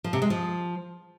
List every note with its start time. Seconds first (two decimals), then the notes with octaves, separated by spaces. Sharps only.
0.04 F3
0.13 C3
0.22 G#3
0.30 F3